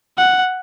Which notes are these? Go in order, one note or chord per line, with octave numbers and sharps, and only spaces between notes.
F#5